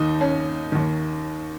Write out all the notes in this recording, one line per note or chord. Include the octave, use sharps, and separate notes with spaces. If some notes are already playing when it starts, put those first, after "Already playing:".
Already playing: D#2 D#3 D#4
C#4
D#2 D#3